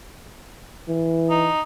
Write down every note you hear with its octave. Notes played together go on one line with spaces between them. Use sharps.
E3
D#4